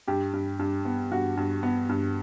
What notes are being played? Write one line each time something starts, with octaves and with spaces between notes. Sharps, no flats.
G2 G4
G2
G2
B3
G2 F#4
G2
B3
G2